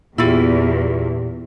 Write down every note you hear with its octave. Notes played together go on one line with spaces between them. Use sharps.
E2 A#2 E4 F4 G4